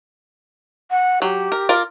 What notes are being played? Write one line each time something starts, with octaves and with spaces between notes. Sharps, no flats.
F#5
F#3 G4
A#4
F4 A#4 D5